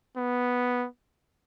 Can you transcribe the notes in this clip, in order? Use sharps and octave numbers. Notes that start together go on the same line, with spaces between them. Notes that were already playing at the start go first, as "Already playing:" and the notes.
B3